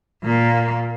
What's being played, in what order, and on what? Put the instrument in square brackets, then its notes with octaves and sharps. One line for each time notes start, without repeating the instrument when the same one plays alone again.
[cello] A#2 A#3